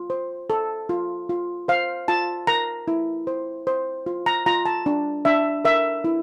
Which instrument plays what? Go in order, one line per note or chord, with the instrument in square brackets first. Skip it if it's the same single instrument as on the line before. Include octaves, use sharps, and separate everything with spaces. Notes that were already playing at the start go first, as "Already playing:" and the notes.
Already playing: [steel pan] F4
C5
A4
F4
F4
C5 F5
F4 A5
A#4 A#5
E4
C5
C5
F4
A#5
F4 A#5
A5
D4
D4 E5
A#4 E5
E4